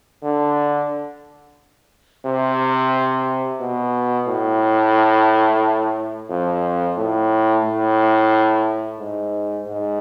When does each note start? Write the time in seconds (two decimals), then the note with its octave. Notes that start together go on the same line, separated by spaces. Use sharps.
0.22 D3
2.25 C3
3.59 B2
4.27 A2
6.29 F2
6.97 A2
7.64 A2
8.99 G#2
9.66 G#2